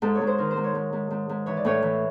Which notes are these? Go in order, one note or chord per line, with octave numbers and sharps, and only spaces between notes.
G#2 A4
C#5
G#2
C5
D#3 A#4
C5
G#2
C#5
G#2
G#2
G#2
G#2
E3 C#5
D5
A2 C#5
E3